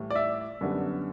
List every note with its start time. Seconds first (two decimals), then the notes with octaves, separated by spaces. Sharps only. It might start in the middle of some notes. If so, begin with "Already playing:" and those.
Already playing: A2 E3 G3
0.10 D5
0.16 E5
0.61 F#2 D3 G3 B3